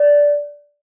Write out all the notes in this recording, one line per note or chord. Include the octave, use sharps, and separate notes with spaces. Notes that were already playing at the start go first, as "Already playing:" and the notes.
Already playing: D5